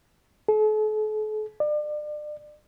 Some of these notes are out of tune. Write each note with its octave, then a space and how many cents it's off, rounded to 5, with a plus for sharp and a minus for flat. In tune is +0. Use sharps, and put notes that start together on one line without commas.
A4 -45
D5 +35